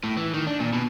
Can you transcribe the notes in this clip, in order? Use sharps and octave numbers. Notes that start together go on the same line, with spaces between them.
A2
E3
D#3
D4
A#2
B2